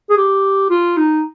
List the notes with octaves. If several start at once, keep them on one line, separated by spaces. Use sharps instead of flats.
G#4
G4
F4
D#4